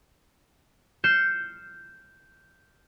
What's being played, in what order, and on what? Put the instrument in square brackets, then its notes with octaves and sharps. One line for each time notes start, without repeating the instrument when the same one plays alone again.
[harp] F6 G6 C7 C#7 E7